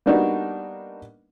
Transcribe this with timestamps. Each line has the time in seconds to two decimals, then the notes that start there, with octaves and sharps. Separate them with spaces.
0.06 G3 A#3 B3 D4 D#4 F#4